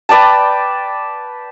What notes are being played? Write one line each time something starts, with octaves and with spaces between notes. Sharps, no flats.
B4 D5 G5 A5